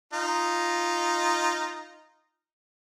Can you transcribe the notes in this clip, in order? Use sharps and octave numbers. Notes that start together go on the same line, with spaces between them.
D#4 F4